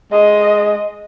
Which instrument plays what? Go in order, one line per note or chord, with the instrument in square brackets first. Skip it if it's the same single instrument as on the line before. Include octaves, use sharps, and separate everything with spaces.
[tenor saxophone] G#3 [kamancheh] D#5